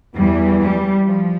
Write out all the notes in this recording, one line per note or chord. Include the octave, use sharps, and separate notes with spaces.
E2 E3 G3
G3
F3